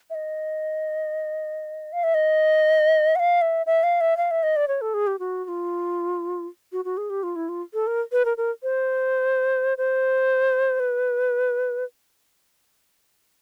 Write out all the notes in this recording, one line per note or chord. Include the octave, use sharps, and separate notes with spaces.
E5
D#5
F5
E5
D#5
F#5
F5
E5
E5
F5
E5
F5
E5
D#5
D5
C#5
A4
G#4
G4
F#4
F#4
F4
F#4
F#4
G#4
G4
F4
E4
F4
A4
A#4
B4
A#4
A#4
C5
C5
B4